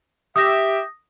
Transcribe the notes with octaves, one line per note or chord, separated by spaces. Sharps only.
G4 E5 D#6 A#6